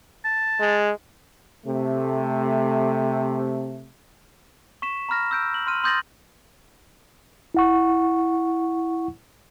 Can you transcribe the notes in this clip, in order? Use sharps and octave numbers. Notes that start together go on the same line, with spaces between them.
A5
G#3
C3 A3
C#6 B6 E7
A#5 B5 F6 A#6
E6 G6 D7
F#7
C6 F6 D#7
C6 D#6 G6 A6 A#6 F#7
E4 F#5 C#6